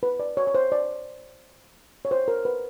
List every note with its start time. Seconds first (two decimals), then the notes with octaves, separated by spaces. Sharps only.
0.03 B4
0.20 D5
0.37 C#5
0.47 C#5
0.55 C5
0.72 D5
2.05 C#5
2.11 C5
2.28 A#4
2.45 B4